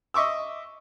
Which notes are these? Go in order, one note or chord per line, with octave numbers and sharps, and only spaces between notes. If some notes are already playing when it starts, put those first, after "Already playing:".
D#5 E5 C#6 D6 E6